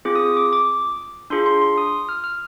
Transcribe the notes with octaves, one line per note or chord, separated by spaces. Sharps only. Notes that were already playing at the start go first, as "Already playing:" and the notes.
C4 F4 G#4 D6
D#6
D#6
D6
D6
D4 F4 G#4 C6
C6
C6
D#6
F6
F6